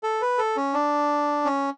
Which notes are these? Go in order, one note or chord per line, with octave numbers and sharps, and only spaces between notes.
A4
B4
A4
C#4
D4
C#4